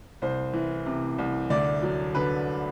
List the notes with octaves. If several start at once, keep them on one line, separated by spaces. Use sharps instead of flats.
C2 C5
E3
C3
C2
D2 D5
F#3
D3 B4